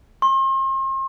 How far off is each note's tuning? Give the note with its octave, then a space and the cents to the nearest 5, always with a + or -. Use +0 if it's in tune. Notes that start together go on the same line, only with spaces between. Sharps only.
C6 +40